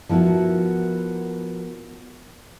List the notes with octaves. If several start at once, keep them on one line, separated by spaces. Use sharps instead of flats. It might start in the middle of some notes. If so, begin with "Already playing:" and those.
F3 B3 E4 F#4 A#4